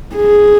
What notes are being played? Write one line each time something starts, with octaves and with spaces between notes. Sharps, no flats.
G#4